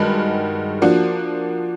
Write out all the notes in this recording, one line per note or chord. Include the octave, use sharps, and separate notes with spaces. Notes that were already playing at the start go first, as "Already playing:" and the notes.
Already playing: G2 D#3 G#3 F#4
F3 A#3 D4 F#4